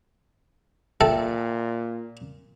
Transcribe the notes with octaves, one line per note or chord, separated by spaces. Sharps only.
A#2 A4 E5 G5